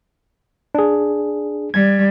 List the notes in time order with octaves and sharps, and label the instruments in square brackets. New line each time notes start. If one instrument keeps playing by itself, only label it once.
[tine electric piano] D4 G#4
[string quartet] G3 [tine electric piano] G#6